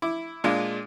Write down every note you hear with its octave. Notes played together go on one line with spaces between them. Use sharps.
E4 D6
A#2 G#3 D4 F4